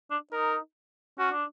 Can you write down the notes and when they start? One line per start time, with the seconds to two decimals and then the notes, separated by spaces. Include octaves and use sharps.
0.11 D4
0.32 D#4 A#4
1.19 C#4 F#4
1.31 D4